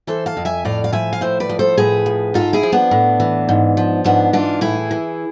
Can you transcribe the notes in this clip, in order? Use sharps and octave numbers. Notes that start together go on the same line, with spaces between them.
E3 A4 C5
F5 A5
F2
E5 G#5
A2 D5 F5
F5
F3 E5 G#5
F5
A2 C5 E5
B4 D5
F3
A4 C5
A2 G#4 B4
F3
G#2 F4 A4
E4 G#4
F3
B3 D4
A2
E3
G#2
F3
G#2 B3 D4
E3 D4 F4
A2 E4 G#4
E3